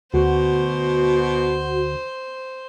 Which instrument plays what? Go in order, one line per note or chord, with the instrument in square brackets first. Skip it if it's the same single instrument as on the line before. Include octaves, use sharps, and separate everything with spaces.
[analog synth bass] D2 [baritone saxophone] B2 [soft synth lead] F#4 [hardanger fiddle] C5